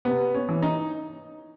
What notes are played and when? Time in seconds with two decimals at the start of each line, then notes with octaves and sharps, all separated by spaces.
0.05 C3 B3
0.34 C#4
0.49 E3
0.62 D#4